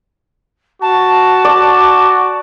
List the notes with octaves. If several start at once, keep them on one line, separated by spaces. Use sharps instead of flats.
F#4 A5
D5